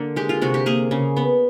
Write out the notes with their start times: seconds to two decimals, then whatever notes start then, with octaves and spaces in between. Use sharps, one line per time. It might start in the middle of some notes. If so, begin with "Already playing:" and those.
Already playing: D3 A#3
0.16 G#3 G4
0.29 F4
0.41 C3 F#4
0.54 G4
0.66 A#3 G#4
0.91 C#3
1.17 B3